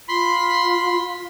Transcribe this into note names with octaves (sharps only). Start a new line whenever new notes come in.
F4 B5 C6